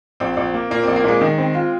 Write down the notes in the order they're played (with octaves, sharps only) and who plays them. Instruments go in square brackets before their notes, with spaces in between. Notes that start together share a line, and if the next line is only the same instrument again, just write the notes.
[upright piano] A#1 [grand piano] C4
[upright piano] A#1
A#3
[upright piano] A#2 [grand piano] A#3
[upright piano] A#1 [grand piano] C4
[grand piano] A#3
[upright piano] A#2 [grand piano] G#3
[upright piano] D#3
C4
F4